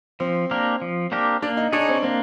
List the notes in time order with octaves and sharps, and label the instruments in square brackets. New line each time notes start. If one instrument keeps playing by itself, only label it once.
[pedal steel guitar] F3 [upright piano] C4
[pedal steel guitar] A#3 D4 G4 A#4
F3
A#3 D4 G4 A#4
[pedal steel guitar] A#3 [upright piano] D4
[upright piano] D#4
[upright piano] D4 [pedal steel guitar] D#4 G#4 C#5
[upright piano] C4
[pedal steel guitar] A#3 [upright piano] C4